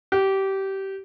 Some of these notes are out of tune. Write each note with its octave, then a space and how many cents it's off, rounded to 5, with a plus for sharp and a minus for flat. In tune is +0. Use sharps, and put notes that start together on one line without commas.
G4 -20